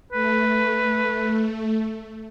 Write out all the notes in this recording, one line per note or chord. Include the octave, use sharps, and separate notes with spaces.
A3 B4